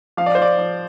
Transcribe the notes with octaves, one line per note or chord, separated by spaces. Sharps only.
F3 F5
D5
C5
F3 D5
F3